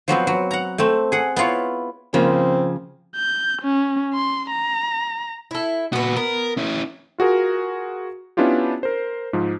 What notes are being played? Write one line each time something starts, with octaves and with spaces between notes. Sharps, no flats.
F3 F#3 B3 C4
F#3
F#5 A#5
A3 C4
G#4 F#5
B3 E4 F4 C#5
C#3 F3 A#3 C4
G6
C#4
C6
A#5
E4 A4
A#2 B3 F#4 B4
B3 A#4
C#4 E4
F4 F#4 G#4 A#4
B3 C#4 D4 E4 F4 G4
A#4 C5
G#2 F3